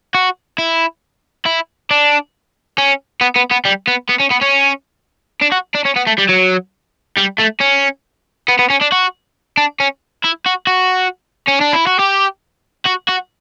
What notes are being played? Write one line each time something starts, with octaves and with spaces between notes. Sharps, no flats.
F#4
E4
E4
D4
C#4
B3
B3
B3
G3
B3
B3
C#4
B3
C#4
D4
F#4
D4
C#4
B3
A3
G3
F#3
G3
A3
C#4
B3
B3
C#4
D4
F#4
D4
C#4
E4
F#4
F#4
C#4
D4
E4
F#4
G4
F#4
F#4